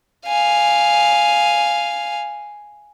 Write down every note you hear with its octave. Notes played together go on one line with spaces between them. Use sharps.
F5 G#5